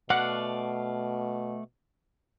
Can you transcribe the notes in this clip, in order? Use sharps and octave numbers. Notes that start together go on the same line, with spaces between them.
B2 A3 D5 F5 F#5